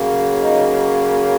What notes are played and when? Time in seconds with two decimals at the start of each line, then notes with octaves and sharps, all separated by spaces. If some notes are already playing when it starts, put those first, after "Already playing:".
Already playing: C#3 F#3 A#3
0.43 D#4